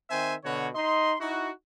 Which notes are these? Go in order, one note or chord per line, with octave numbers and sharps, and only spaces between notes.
D#3 C4 C5 E5 G#5
B2 D3 F#4 C#5
D#4 D#5 C6
D#4 E4 F#4